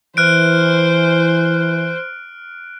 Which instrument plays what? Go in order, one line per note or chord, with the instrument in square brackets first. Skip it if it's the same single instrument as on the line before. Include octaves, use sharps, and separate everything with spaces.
[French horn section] E3 [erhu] C5 [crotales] F6 F#6 D7